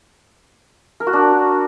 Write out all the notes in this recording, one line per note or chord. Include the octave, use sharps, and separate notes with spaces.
A#4
F#4
D4